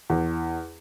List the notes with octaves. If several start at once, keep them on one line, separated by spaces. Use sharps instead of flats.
E2